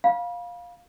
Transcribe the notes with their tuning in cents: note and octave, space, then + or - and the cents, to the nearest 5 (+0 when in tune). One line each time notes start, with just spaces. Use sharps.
F5 +10 B5 -35